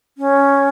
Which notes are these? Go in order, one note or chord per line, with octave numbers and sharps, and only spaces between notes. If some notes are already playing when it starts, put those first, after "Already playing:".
C#4